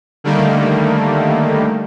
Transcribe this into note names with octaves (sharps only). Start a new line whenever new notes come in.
D3 D#3 G3 A3 A#3